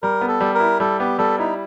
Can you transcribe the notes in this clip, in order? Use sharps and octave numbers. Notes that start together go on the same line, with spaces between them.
G3 A#4
B3
A4
G3
A#4
E4
G3 A4
B3 G4
G3 A4
D#4 E4